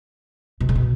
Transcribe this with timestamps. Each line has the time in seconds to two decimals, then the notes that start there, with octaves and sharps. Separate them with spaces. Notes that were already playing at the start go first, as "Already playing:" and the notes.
0.60 B2
0.69 C#3
0.75 B2